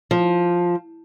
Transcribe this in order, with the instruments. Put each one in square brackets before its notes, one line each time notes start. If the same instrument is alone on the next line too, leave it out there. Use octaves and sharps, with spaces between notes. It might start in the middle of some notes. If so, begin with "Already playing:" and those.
[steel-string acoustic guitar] F3